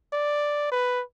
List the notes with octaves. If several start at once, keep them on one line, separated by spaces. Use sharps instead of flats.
D5
B4